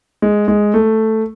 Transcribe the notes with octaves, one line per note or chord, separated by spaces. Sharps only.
G#3
G#3
A3